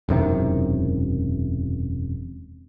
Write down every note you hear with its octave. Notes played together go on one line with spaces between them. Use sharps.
E1 F#2 C3 D#3